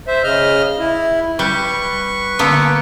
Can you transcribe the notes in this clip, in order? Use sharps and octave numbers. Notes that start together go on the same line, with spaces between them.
C5 E5
C#3 D#5 F6
E4
G3 B4 C#6
D3 A#3 B3